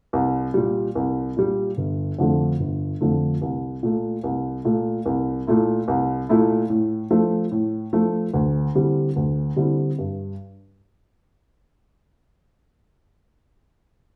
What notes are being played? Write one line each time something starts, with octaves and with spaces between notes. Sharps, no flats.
C2
A#2 G3
C2
A#2 G3
G1
F2 D3 F3 A3
G1
F2 D3 F3 A3
C2
A#2 A3
C2
A#2 A3
C2
A#2 A3 E4
C2
A#2 A3 E4
A2
F3 A3
A2
F3 A3
D2
D3 G3 C4 E4
D2
D3 G3 C4 E4
G2